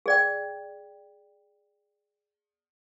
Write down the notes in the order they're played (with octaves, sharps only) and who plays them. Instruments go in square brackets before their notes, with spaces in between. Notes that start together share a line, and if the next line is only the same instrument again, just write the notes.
[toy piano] G#4 D5 G5